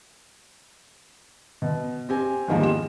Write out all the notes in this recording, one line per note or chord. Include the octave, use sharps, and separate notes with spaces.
B2
C4 G4 G#5
E2 G#2 D#3 F3 G3 A#3
E7